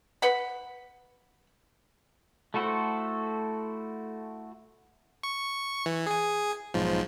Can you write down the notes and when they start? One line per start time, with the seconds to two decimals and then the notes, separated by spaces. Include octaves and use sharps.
0.22 B4 F#5 B5
2.54 A3 E4 F#4 A4 C5
5.23 C#6
5.86 E3
6.07 G#4 G#5
6.74 B1 G#2 F3